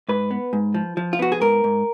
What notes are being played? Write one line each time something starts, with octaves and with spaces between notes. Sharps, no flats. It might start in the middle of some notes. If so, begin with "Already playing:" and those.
G#2 B4
B3
G#2
F3
F3
F4
B3 F#4
G#4
G#2 A#4
G#2